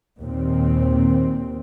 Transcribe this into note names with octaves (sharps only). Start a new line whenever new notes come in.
D#2 A#2 C4